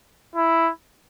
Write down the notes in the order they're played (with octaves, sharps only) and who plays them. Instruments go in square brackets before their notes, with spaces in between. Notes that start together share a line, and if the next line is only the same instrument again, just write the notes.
[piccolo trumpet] E4